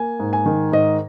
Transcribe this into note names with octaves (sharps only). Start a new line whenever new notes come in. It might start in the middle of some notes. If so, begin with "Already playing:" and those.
Already playing: A#3 G#5
G#2
G#5
D#3
G#2 D#5